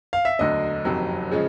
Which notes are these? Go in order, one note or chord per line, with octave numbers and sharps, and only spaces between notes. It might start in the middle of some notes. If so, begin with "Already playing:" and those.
F5
E5
E1 D2 D3 F#3 D#5
F#1 F2 C3 D#3 F#3
C#3 F3 G#3 C#4